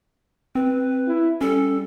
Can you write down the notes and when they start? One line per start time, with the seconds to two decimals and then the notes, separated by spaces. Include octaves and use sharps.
0.55 C4 B4
1.07 E4
1.41 G3 C#4 A4